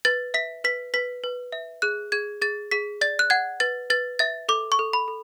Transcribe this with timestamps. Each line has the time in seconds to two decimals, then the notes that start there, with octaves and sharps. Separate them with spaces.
0.05 B4 A6
0.34 E5 B6
0.64 B4 B6
0.94 B4 B6
1.24 B4
1.52 E5
1.82 G#4 F#6
2.12 G#4 G#6
2.41 G#4 A6
2.71 G#4 B6
3.01 D5 A6
3.19 F#6
3.30 F#5 G#6
3.60 B4 A6
3.90 B4 A6
4.19 E5 A6
4.49 A4 D6
4.72 C#6
4.79 A4
4.93 B5
5.08 A4